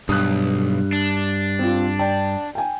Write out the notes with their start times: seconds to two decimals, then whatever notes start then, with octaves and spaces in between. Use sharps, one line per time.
0.09 B1 G2 D#6 F#6
0.93 D4
1.59 C4 F4
1.99 D5 G5 A5
2.55 G5 G#5